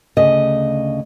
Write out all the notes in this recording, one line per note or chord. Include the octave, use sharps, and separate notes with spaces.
D2 C#3 D#5